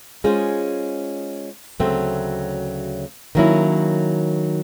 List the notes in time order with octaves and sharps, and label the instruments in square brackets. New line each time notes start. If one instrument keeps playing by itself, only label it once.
[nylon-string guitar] G#3 C#4 F4 G#4 C5
D2 C#3 F#3 A3 C4
D#3 F#3 A#3 C#4 E4